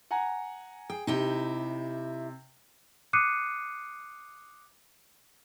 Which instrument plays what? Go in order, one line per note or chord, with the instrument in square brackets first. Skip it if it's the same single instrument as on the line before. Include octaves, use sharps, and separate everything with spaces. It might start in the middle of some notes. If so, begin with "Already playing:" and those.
[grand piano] F#5 G#5 A#5
[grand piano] G#4 [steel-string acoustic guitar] G5
[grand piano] C3 [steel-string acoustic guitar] D#4 E4 G4
[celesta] D6 D#6 F#6 C7 C#7 D#7